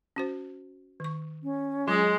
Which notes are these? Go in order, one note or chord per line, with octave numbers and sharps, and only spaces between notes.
C#4 F#4 C5
D#3 C#6
C#4
F#3 G#3 F4 C#5